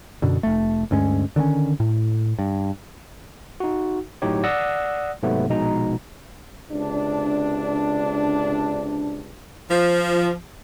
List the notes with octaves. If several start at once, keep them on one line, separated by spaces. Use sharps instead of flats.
F#2 B2 D3
F1 A3
D2 G2 G#3 C#4
D3 D#3 C4 C#4
A2
G2
D#4 F#4
G1 A2 F#3 D#4 G4 C#5
D5 F#5 D#6 E6 F#6 A#6
G#2 C3 F#3 A3 B3
A#1 B2 G#3 D#4 A#5
C#2 C3 D4
F3